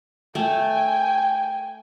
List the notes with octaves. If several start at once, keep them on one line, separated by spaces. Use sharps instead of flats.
A3 G5 G#5